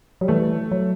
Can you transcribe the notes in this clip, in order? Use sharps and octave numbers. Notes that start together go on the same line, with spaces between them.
F#3 G3
E3 A3
F#3